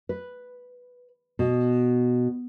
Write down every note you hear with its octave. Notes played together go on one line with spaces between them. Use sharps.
B4
B2